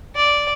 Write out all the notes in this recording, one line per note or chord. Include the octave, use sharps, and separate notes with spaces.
D5